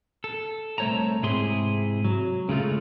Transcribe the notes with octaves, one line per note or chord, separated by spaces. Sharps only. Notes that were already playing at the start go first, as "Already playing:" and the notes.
A4
C2 A3 C5 C#5 A5 A#5
G#2 C3 E4 G#4 C6
F#3
C#3 G#3 A3 F4